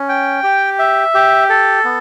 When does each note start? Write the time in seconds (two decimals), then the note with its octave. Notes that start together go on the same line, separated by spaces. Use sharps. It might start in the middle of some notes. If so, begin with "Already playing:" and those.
Already playing: C#4
0.09 G5
0.43 G4
0.79 E5
1.14 G4
1.50 A4
1.85 B3